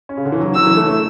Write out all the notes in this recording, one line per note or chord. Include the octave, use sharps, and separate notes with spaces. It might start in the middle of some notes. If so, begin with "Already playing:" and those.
C#4
C#3
D3
E3
F#3
F#3 E6
E3
A3
A3